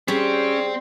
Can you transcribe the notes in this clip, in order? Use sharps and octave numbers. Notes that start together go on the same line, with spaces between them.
G3 C4 C#4 G#4